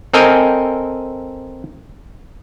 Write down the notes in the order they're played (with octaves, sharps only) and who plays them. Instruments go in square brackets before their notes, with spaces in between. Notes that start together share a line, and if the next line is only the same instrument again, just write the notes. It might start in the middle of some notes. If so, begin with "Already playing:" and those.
[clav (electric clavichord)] C4 A4 A#4 D#5 G5 G#5